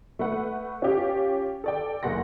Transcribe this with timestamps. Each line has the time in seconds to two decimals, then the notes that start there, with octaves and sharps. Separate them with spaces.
0.19 A3 B4 F#5
0.82 C#4 F4 G4
1.64 A4 D5 G5
2.03 F#1 F#5 C6 A#6